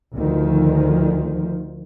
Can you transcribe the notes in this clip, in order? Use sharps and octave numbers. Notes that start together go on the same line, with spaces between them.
D2 D#3 F3